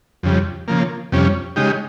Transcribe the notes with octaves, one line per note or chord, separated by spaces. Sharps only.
F2 C#3 G3
C#3 F3 A#3
F2 C3 G3 C#4
C#3 G#3 D#4 G4